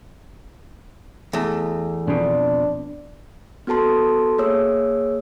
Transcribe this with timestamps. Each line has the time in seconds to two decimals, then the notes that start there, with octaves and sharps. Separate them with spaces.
1.33 E2 A3
2.07 F2 B2 D4
3.67 B3 F#4 A4 A5 C6
4.38 A#3 G#4 C#5 E6